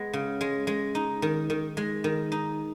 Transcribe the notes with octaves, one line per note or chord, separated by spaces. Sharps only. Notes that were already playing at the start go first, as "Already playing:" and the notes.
Already playing: G#3 B3
C#3
G#3
G#3
D#4
D#3
D#3
G#3
D#3
D#4